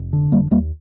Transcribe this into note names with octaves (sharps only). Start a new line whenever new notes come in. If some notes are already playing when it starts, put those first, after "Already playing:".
Already playing: F1
D3
F1 G3 A#3
D#2 G3 A#3